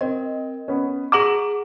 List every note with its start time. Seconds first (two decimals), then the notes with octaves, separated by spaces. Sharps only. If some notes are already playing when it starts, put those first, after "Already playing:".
0.01 C4 A#4 D#5
0.68 B3 C#4
1.12 G#4 F#5 A#5 D6 E7 F#7